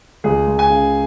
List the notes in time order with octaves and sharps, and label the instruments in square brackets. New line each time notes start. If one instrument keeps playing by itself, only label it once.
[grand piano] C#2 G#4
C#2
G#5
C#3